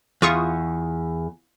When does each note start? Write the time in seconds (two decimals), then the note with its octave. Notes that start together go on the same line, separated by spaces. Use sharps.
0.22 E2 F4 C#6 D#6